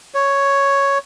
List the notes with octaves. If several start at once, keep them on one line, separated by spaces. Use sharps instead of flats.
C#5